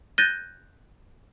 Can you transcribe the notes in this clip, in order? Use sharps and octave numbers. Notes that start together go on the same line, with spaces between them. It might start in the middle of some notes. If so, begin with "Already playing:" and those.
F#6 G6 A6 A#6 D#7 G7